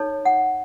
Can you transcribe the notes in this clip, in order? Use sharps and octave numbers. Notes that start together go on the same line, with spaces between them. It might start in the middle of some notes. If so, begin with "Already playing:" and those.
Already playing: D#4 A4 C#5
F#5